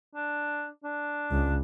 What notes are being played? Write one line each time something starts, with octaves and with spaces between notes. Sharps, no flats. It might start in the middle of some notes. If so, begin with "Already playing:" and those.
D4
D4
C#2